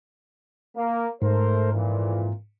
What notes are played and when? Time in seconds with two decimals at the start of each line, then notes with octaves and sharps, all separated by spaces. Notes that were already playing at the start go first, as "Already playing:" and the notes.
0.76 A#3
1.22 G#2 A3 A#4 C5
1.73 F2 A#2 E3